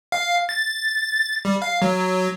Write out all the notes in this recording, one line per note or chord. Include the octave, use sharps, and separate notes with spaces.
F5
A6
G3
F5
F#3